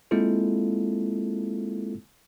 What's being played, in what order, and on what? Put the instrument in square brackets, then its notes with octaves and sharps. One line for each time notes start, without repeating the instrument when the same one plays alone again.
[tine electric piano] G#3 A#3 C4 E4 F4 A4